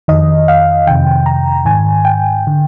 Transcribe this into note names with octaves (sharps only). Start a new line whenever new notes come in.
F2 D#3 D#5
F5
F2 C3 D#3 G5
A#5
G#2 D#3 G#5
G5
D3